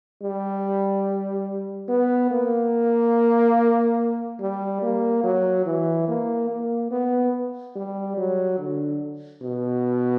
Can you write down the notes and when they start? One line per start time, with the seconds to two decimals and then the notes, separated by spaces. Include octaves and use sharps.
0.22 G3
1.89 B3
2.31 A#3
4.40 G3
4.82 A#3
5.24 F#3
5.66 E3
6.08 A#3
6.50 A#3
6.91 B3
7.76 G3
8.17 F#3
8.59 D3
9.42 B2